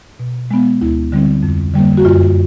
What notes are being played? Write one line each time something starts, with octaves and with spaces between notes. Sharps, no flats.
B2
G#3 B3
D2 E4
D3 G3 C4
F2
D3 G3 A#3
F#4
F#2 F4